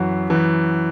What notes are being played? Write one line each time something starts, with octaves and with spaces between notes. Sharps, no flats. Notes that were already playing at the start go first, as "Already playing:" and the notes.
Already playing: F#2 E3 F#4
F#2 E3